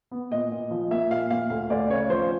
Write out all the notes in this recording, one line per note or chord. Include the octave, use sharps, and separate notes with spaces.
B3
A#2 D#5
A#2
F3
A#3 E5
A#2 F5
A#2 F5
D2 F5
D2 D5
C#3 C#5
F3 C5